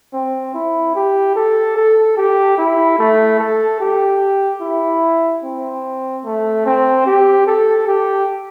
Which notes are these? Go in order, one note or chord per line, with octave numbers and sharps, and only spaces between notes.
C4
E4
G4
A4
A4
G4
E4
A3
A4
G4
E4
C4
A3
C4
G4
A4
G4